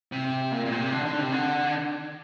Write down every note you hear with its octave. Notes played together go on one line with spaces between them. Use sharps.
C3
A#2
A#2
C3
D3
D3
C3
D3